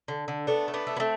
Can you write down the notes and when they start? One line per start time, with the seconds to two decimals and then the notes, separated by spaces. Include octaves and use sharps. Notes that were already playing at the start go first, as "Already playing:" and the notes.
0.08 D3
0.28 D3
0.47 A3 B3 D4
0.68 A3
0.74 B3 D4
0.87 A3
0.97 B3
1.00 A3 C4